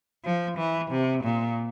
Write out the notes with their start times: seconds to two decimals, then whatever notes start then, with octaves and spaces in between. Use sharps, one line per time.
0.24 F3
0.58 E3
0.91 C3
1.24 A#2